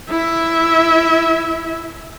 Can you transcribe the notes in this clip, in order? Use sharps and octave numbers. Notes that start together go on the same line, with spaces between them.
E4 E5